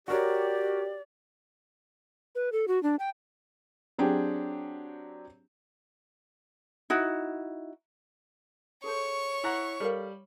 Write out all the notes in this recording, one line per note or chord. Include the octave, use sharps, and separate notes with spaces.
F#4 G4 A#4 C#5 D5
B4
A4
F#4
D4
G5
F#3 C4 D4 G4 G#4
D#4 E4 F#4
G#4 A4 C5 C#5 C#6
E4 F#5 A#5
G3 A4 A#4 F5